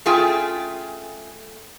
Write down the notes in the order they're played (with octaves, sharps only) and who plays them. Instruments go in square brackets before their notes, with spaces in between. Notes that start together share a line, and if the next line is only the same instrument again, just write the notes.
[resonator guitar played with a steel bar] A3 C#4 F4 G#4 G5 G#5